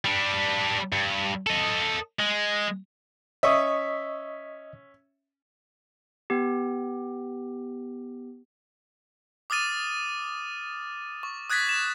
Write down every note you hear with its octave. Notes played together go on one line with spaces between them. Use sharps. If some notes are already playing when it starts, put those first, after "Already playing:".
G3 D4
G2
A4 D#5
G#3
C#4 D#5 E5 C#6 D#6
B3 G4
D6 D#6 F6 A6 D#7
C#6
D#6 F#6 G#6 A6 B6
E7